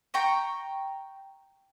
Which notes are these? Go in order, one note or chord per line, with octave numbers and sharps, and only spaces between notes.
G5 A#5 C#6